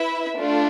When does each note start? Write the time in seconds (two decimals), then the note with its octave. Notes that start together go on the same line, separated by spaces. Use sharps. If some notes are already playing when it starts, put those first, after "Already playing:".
Already playing: E4 B4 E5
0.37 A3 D4 F4